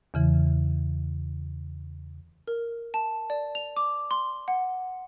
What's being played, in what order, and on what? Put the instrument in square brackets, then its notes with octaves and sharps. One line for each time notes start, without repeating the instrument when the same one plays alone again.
[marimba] E2 C#3 E3
[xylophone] A#4
A5
D5
F7
D6
C6
F#5